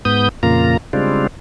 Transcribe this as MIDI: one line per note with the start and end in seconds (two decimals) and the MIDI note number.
0.05 0.29 44
0.05 0.29 59
0.05 0.29 87
0.05 0.29 91
0.43 0.77 41
0.43 0.77 46
0.43 0.77 49
0.43 0.77 58
0.43 0.77 65
0.43 0.77 82
0.93 1.27 49
0.93 1.27 55
0.93 1.27 56
0.93 1.27 60
0.93 1.27 62
0.93 1.27 65